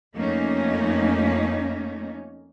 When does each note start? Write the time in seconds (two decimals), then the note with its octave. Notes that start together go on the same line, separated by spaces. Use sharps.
0.16 F2 A3 A#3 C#4 D#4